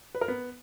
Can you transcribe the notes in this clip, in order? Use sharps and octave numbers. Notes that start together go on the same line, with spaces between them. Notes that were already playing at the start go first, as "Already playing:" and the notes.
B4
A#4
B3